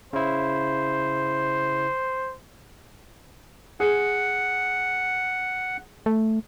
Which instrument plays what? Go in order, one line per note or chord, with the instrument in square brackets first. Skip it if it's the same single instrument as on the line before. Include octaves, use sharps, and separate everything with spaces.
[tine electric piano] C#3 E4 [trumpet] C5
[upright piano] G#4 [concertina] F#5
[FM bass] A3